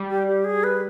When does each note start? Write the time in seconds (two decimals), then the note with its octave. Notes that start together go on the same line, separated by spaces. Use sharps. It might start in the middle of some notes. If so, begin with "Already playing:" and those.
Already playing: G3
0.09 G4
0.28 G4
0.45 G#4
0.64 B4